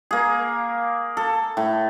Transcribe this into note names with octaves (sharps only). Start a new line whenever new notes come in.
A#3 G#4
A4
A2